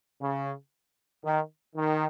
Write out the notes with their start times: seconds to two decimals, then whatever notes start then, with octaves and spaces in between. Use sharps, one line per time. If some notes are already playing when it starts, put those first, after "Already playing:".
0.21 C#3
1.25 D#3
1.76 D#3